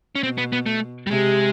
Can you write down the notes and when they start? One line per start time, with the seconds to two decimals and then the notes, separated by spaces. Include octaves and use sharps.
0.15 C#4
0.23 B2 C4
0.38 B3
0.53 B3
0.66 A3
1.07 G3
1.10 C3 G#3